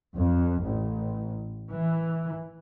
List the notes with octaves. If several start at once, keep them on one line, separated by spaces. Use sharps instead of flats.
F2
A1
E3